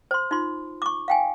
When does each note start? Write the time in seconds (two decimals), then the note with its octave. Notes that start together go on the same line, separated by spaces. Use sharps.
0.11 C5 C6
0.31 D#4 F4 C6
0.82 C#6 D6
1.08 F5 G5 G#5